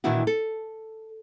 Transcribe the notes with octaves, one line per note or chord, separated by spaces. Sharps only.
A#2 D#3 E3 D4 E4 F#4
A4